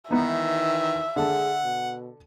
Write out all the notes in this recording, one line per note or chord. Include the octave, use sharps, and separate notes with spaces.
D#3 E3 B3 D#4 E5
D3 G#4 A4 F#5
B2